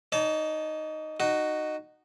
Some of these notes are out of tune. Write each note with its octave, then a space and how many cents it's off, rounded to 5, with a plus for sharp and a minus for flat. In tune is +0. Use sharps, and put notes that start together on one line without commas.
D#4 +0 C#5 +45 A5 -15
D#4 -15 F#4 +10